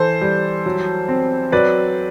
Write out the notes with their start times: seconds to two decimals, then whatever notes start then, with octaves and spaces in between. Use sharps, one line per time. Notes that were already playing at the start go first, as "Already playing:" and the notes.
Already playing: E3 A4 C5
0.21 G3
0.66 F#3
1.08 C4
1.52 F#3 B4 D5